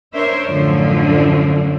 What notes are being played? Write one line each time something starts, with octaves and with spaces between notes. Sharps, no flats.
D4 A#4 C5 C#5 E5
F#2 A2 D3 F3